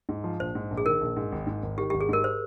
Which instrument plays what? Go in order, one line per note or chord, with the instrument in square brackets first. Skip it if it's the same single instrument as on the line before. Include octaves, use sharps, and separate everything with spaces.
[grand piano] G#2
F3
[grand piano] A#1 [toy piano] C5
[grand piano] G#2
A#1
[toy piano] G#4
[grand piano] D#3 [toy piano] A#4
[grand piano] A#1
G#2
G#1
G#2
G#1
[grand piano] D#3 [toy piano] G4
[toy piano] G4
[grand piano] G#1
[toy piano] G#4
[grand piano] G#2 [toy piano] A#4
[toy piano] C5